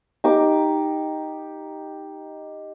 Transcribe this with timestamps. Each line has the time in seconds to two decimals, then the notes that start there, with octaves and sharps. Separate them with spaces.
0.24 D#4 G4 D6